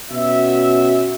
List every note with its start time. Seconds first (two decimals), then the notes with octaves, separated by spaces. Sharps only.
0.11 B2 C#4 F#4 E5